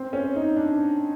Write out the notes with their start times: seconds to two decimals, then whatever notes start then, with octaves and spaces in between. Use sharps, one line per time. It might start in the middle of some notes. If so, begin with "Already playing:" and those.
Already playing: C4
0.13 C#4
0.36 D#4
0.57 D4